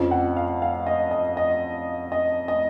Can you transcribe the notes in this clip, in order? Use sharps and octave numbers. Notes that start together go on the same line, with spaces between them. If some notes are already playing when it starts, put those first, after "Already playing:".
Already playing: F2 C#3 F3
F#5
F5
F5
D#5
D#5
D#5
D#5
D#5